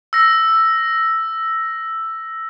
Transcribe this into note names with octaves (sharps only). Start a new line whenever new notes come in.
E6 A#6